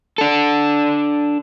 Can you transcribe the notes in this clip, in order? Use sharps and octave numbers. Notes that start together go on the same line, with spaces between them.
D4 A4